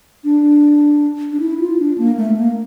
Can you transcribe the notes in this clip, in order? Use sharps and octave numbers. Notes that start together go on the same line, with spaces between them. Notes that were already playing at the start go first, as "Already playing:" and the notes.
D4
D4
E4
F4
D4
A#3
A3
A#3